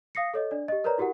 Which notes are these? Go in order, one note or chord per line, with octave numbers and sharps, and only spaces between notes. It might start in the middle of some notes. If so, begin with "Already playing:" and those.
F5 D#6 A#6 C7 C#7
A4 C#5 D#5
D4 D5
G4 D#5
A#4 B4 C#5 D5 A#5
E4 F#4 G4 A#4 F#5